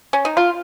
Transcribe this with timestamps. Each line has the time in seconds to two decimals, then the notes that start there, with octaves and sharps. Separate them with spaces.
0.13 C#4
0.25 D#4
0.37 F4